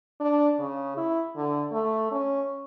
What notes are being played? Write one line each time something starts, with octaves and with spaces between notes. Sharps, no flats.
D4
C#3
E4
D3
A3
C#4